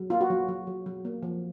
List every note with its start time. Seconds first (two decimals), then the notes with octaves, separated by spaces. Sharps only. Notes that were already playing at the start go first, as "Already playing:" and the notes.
Already playing: F#3
0.10 A#3 F4
0.21 F#4
0.30 F#3
0.48 F#3
0.67 F#3
0.86 F#3
1.05 A#3
1.23 F3